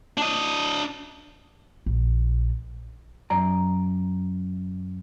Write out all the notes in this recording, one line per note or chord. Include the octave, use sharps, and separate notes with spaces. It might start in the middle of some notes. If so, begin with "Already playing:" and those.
D4 D#5
A#1
F#2 D5 A#5